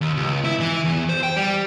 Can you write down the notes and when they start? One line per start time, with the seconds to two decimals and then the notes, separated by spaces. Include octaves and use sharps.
0.01 D#2
0.17 C#2
0.44 E4
0.60 E3
0.85 E2
1.09 C5
1.23 G5
1.37 G3